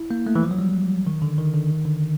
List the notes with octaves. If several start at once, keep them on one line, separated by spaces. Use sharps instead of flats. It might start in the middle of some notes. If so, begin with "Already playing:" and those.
Already playing: E4
A#3
A3
E3
F3
F#3
G3
D#3
D3
D#3
D3
D#3
D3
D#3